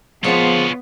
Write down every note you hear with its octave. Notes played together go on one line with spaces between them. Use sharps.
F3 G#3 A#3 B3 F4 C#5 D5